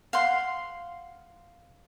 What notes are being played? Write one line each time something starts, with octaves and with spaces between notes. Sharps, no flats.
F5 F#5 C6